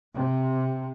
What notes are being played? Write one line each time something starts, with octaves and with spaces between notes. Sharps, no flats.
C3